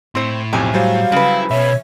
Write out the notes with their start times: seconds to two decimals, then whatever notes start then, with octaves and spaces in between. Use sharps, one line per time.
0.15 A2 C4 C5 C6
0.53 B1 F2 C3 G#5
0.74 F#3 G3 C5 F5
1.12 C#3 E4 B4
1.51 B2 C#5 E5